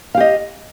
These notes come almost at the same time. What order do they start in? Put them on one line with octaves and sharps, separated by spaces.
F5 G4 D#5